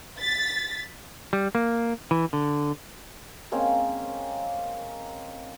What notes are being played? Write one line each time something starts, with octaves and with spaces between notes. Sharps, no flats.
A6 B6
G3
A#3
E3
D3
G#3 A#3 C4 C#4